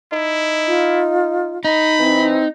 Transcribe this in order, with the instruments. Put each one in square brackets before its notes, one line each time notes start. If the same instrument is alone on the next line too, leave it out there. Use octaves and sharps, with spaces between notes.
[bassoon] D#4 [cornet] E4
[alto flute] F4
[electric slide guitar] D#4 [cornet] B5
[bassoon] E3 [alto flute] C4